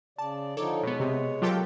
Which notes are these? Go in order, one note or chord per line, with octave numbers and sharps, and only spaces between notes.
C#3 D5 A5
D3 F3 D#4 A4 C#5 D6
B2 G#3 B3 C#5
C3
F#3 F4 G4 A4 A#4 G5